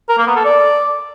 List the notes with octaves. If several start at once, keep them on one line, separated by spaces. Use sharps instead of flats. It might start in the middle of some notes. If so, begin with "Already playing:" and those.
A#4
A#3
B3
A4
D5